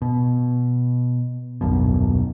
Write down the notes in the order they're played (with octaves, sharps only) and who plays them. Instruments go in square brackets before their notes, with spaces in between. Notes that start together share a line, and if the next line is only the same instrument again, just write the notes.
[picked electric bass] B2
D#1 B1 F#2 B2